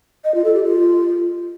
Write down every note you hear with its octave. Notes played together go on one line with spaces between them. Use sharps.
D#5
F4
A4
G4
F4